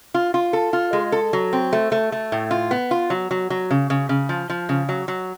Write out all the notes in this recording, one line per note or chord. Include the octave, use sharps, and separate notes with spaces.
F4
F4
A4
F4
G#3
A4
F#3
C4
A3
A3
A3
A2
F4
B3
F4
F#3
F#3
F#3
C#3
C#3
C#3
F3
F3
C#3
F#3
F#3